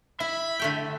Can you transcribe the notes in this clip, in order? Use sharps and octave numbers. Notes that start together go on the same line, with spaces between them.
E4 E5 B5
D3 A3 G5